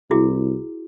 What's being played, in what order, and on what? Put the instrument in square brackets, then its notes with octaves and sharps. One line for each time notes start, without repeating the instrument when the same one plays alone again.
[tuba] C2 [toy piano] E4 F#4 G#4